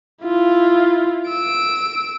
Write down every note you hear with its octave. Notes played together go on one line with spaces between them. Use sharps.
E4 F4
E6 D7